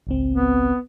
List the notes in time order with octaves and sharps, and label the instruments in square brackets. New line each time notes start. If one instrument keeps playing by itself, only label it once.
[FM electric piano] G#1 C#2 C4
[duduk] B3